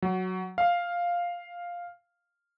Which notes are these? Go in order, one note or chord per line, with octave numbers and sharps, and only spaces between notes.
F#3
F5